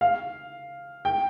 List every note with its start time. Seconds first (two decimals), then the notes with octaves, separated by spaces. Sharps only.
0.01 F5
1.05 G5